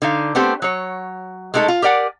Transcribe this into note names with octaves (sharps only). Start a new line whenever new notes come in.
D3 D#4 F5
A3 B3 C4 G4 C5
F#3 C#5
G#3 A3 D#4 G#4 A4
F4
G4 A#4 D5 F#5 G#5